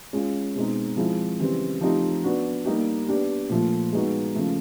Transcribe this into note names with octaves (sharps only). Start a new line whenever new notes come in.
G#3 C#4 F4
B2 G#3 C4 D#4
F3 G#3 C4 E4
C#3 E3 G3 C4
F3 A3 C4 D#4 G4
B3 D4 F#4
G3 A#3 D#4 G4
B3 D4 G4
A#2 F3 A3
G#3 B3 D#4 F#4
C#3 F3 A3